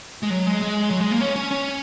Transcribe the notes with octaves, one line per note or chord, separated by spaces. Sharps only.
G#3
F#3
G#3
G#3
F#3
G#3
A#3
C#4
C#4
C#4